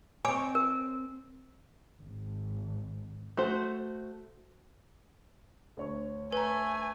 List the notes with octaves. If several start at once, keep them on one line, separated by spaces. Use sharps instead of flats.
C4 C#5 G#5 D6
A#4
G#1
A3 F#4 C5
D2 C#5 C#6
A3 B4 G#5 A#5